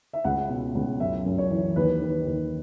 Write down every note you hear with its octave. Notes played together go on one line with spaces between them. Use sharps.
E5
C#2 F#5
B2
C#2
F#2 E5
F#2
C#5
E3
D#2 B4
D#3
D#2